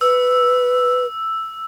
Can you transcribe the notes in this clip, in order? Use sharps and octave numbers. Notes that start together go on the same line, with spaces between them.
B4 E6